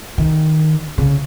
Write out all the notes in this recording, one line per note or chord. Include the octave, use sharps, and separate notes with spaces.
D#3
C#3